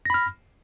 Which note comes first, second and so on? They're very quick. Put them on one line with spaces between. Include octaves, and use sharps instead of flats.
A#6 B5 F6